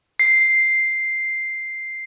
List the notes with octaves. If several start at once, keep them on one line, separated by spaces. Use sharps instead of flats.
C7